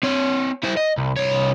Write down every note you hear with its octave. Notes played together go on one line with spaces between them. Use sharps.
C4 C#5
E4 C5
D#5
C2
C2 C#5